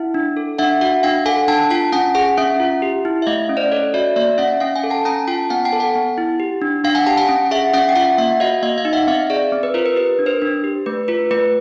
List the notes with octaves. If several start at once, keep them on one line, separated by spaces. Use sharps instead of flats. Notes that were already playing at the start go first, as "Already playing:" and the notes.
Already playing: E4 E5 F#5
D4
A4
D4 E5 F#5
F#4 E5 F#5
D4 F5 G5
A4 F#5 G#5
D4 G5 A5
F4 G5 A5
C#4 F#5 G#5
G#4 F#5 G#5
C#4 E5 F#5
F4
G4
E4
E5
A3 D#5 F5
C#4
C5 D5
A4 C#5 D#5
F#4 D5 E5
A#3 D5 E5
C#4 E5 F#5
C#4 F5 G5
F#5 G#5
A4
G5 A5
C#4 G#5 A#5
F4 G5 A5
B3 F#5 G#5
G5 A5
A4
F#5 G#5
B3
E4
G4
D4
D4 F5 G5
F#5 G#5
G4 G5 A5
F#5 G#5
C#4
G#4 E5 F#5
C#4 E5 F#5
G5
F4 E5 F#5
A#3 E5 F#5
F#4 D#5 F5
A#3 D#5 F5
D#5 F5
D#4
E5 F#5
C4 D#5 F5
G#4 D5 E5
C4
B4
F4 A#4 C5
B4
G4 B4
D4
A#4 C5
D4
G4
A3 B4
F4 B4
A3 B4